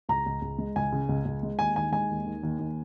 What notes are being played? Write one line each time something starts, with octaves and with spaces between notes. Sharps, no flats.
C#2 A#5
C#2
C#2
G#3
C#2 G#5
C#3
C#2
C#2
G#3
D#2 G#5
D#3 G#5
G#3 G#5
D#2
D#3
D#2
D#2